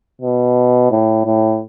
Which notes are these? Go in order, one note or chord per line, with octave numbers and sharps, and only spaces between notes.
B2
A2
A2